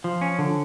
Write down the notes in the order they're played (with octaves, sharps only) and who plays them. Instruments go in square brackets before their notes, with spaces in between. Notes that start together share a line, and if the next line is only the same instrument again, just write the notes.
[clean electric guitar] F3
C#4
D3